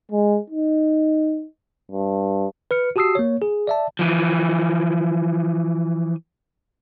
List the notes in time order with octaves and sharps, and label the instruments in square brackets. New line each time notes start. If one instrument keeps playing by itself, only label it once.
[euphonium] G#3
D#4
G2
[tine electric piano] B4 F6 C#7
F#4 G4 A5 D#6 E6 C7
A#3 C#5
G#4
D5 E5 A5
[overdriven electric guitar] E3 F3